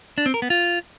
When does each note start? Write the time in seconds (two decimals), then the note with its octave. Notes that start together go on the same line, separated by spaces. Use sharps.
0.18 D4
0.26 C4
0.34 A#4
0.42 B3
0.50 F4